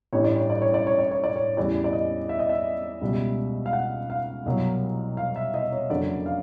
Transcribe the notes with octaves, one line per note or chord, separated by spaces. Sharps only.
A1 G2 E3 G3 C#5
D5
C#5
D5
C#5
D5
C#5
D5
C#5
D5
C#5
E2 C#3 E3 G3 D5
D5
D#5
E5
D#5
E5
C#2 B2 G3
F5
F#5
F5
C2 B2 F#3
F5
E5
D#5
C#5
F#1 F2 D3 F#3 D5
F5